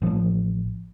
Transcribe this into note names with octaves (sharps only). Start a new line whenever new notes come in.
A1 F3